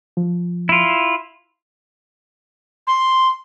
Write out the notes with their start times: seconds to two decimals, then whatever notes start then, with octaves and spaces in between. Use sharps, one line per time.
0.17 F3
0.69 E4 F4
2.87 C6